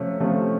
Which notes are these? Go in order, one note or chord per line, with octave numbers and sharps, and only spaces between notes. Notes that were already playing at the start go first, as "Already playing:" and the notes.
Already playing: C3 F3 A3 C#4
C3 F3 A3 C#4